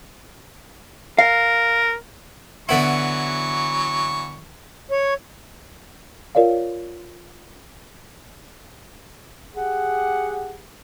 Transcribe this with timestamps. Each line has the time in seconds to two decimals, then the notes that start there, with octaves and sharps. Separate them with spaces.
1.19 A#4 F5
2.69 D3 E3 F#3 B3 E4 C#6
4.91 C#5
6.35 F4 A#4 C#5 D5 F5
9.55 G4 G#4 F#5